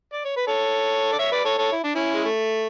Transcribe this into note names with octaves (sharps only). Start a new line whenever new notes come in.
D5
C#5
B4
A4 C#5
D5
C#5 E5
B4 D5
A4 C#5
A4 C#5
E4
D4
C#4 E4
G#3
A3